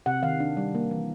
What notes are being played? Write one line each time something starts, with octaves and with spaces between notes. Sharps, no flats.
C3 F#5
D#3 F5
D4
G3
A#3
E3